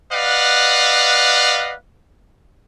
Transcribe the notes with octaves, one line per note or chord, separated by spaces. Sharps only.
B4 D5 D#5 F5 F#5